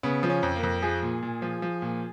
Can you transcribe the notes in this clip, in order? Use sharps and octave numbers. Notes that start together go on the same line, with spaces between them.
C#3 B3
F3
C#4
F2
A#3
F2
F3 G#4
A#2
A#2
F3
F3
A#2